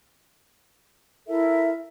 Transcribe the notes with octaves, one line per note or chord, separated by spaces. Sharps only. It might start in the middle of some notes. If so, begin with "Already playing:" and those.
E4 A4 A#4 E5